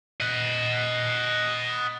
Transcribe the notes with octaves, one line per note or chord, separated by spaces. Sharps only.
D#5 F#5